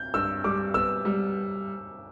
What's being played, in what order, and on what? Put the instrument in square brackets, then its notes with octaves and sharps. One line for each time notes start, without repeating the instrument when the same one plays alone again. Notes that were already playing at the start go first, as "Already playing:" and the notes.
Already playing: [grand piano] G6
[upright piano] G2 [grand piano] E6
[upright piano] G3 [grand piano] D6
[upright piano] B3 [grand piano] E6
[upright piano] G3